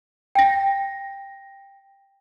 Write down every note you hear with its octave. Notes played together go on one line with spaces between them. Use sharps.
G5 A#6